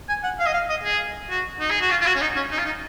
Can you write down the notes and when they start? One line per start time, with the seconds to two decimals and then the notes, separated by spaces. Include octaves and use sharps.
0.09 G#5
0.24 F#5
0.39 F5
0.46 D#5
0.54 F5
0.70 D#5
0.85 G#4
1.30 F#4
1.60 D#4
1.71 G#4
1.81 F#4
1.91 F4
2.01 F4
2.06 F#4
2.16 C#4
2.21 D#4
2.36 C#4
2.52 D#4
2.59 F4
2.66 D#4